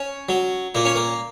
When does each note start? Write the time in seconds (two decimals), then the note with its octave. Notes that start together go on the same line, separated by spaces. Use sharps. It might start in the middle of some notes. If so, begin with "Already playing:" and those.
Already playing: C#4
0.29 F#3
0.75 A#2 A#3
0.85 C#4
0.95 A#3